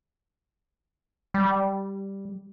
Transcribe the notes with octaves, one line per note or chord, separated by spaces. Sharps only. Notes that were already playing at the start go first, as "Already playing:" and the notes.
G3